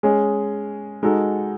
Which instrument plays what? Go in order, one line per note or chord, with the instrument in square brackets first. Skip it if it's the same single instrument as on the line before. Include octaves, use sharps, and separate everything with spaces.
[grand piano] G#3 C#4 G#4
G#3 D#4 F#4 A4